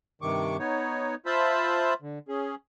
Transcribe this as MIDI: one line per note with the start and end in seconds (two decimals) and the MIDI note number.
0.22 0.57 43
0.22 0.57 48
0.22 0.57 51
0.22 0.57 85
0.22 0.57 86
0.59 1.15 59
0.59 1.15 63
0.59 1.15 73
1.26 1.94 65
1.26 1.94 72
1.26 1.94 76
1.26 1.94 81
1.26 1.94 83
2.02 2.19 50
2.28 2.55 61
2.28 2.55 68